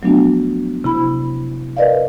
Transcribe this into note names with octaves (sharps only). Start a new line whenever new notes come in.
F3 F#3 A3 B3 D4 F#4
C3 E4 B5
A#4 B4 D5 D#5 F5